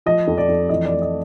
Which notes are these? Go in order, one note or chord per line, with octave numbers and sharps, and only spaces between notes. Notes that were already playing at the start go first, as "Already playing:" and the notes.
F3 D#5
F2
D5
F2
E3 D#5
D5
A3
D#5